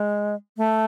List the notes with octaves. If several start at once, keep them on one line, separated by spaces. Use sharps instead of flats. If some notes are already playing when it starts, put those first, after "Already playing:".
Already playing: G#3
A3